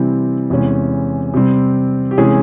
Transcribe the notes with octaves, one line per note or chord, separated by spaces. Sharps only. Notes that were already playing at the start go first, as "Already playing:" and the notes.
Already playing: C3 E3 G3 C4
E2 C3 E3 G#3 C#4
C3 G3 C4
G4
C3 E3 G#3 C#4 G#4